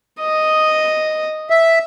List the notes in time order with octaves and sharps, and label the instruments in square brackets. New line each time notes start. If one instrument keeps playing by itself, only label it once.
[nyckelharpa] D#5
[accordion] E5